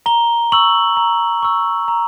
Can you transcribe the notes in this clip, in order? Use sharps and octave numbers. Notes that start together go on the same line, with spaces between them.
A#5 G7
C#6 E6 F#7
A#5
C#6 E6
A#5